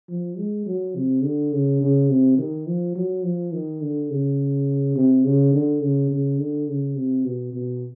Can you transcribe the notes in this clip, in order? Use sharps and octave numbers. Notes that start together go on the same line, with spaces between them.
F3
G#3
F#3
C3
D3
C#3
C#3
C3
D#3
F3
F#3
F3
D#3
D3
C#3
C3
C#3
D3
C#3
C#3
D3
C#3
C3
B2
B2